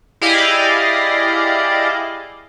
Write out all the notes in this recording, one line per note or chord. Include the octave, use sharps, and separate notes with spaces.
E4 G4 G#4 D5 D#5 F5